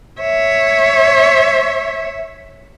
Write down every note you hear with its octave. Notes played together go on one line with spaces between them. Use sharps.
C#5 E5